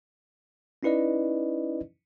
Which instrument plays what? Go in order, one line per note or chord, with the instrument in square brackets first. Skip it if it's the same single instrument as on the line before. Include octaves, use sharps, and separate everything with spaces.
[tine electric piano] C#4 D#4 E4 B4 D5 D#5